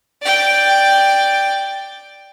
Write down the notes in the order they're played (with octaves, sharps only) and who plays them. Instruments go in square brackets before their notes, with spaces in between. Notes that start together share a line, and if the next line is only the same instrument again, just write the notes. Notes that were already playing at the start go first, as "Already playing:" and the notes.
[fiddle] D5 G5